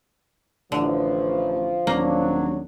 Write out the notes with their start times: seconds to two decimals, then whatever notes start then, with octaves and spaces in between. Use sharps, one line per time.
0.72 A1 D3 F3
1.87 D#1 F#3 A#3 D4